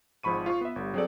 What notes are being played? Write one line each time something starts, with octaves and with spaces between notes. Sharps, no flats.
G#1 G#2 F3 B5 C#6 D#7
F4 C#6
B3 E5
G1 G3
F#3 C4 G#4 A4 D5